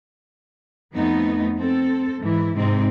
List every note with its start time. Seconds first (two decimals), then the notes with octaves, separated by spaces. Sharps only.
0.95 F2 A3 B3 D#4
1.59 C4 A4
2.20 G#2 E3 E4
2.55 G#2 C3 G#3 C4 D#4